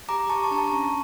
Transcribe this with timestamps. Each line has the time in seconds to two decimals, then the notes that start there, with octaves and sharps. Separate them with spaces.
0.09 G4 A#5 D6
0.29 G4 A5 C#6
0.43 A5 C#6
0.51 D4 A#5
0.58 A5 C#6
0.72 C#4